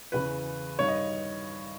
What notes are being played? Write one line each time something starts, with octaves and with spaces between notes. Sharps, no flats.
E2 C#3 E3 B4
G2 D#3 C#5
D#5